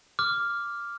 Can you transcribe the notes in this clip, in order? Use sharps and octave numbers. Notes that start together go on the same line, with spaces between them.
D6 F6